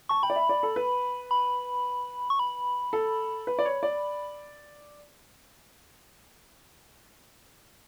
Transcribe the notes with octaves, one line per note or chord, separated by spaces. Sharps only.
A5 C#6
G5 B5
D5
E5
D5
A4
B4
B5
C#6
B5
A4
B4
D5
C#5
D5